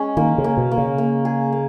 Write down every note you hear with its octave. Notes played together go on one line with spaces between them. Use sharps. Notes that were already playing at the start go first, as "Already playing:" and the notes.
Already playing: G#3 C#4
D#3 A#3
C#3
A#3
B2
A#3
C#3
A#3
G#4
A#3